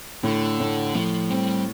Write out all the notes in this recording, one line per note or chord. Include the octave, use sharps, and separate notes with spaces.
A2 D3
A2
A2 F3
G3 C4